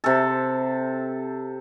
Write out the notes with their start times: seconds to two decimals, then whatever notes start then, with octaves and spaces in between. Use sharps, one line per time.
0.04 C3 A4